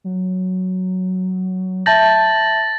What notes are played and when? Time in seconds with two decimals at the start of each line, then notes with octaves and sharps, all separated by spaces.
0.04 F#3
1.86 E5 A5 G6 A6 A#6 F#7